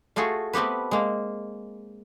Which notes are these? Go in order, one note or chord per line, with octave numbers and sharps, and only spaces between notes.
A3 F4 F#4 G#4 A4
A3 B3 C4 G4 B4
G#3 A#3